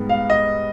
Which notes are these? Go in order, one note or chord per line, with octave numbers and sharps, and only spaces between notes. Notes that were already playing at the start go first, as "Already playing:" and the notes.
Already playing: G#2 G3 B3
F5
D#5